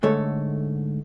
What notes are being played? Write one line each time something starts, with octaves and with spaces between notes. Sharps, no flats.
G#2 D3 A3 A4 C#5